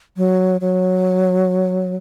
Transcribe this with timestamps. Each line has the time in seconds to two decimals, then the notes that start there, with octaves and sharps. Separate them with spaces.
0.17 F#3
0.61 F#3